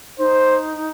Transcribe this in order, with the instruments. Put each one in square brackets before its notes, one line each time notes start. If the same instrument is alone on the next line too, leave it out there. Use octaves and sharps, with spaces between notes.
[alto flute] D#4 [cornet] C5